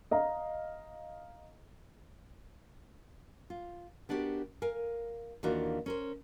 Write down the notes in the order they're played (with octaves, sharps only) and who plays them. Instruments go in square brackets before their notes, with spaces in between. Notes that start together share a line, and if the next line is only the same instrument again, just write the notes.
[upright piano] D#5 F5 A#5
[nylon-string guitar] F4
B3 D4 F#4 G4 A#4
A#4 F5 G#5
D#2 E3 D4 F4 F#4 A#4
C#4 A#4 C5